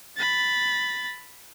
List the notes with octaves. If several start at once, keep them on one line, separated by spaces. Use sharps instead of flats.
B5 A6